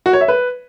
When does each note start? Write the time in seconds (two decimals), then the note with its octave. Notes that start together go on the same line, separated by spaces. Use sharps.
0.06 F#4
0.13 C#5
0.21 E5
0.28 B4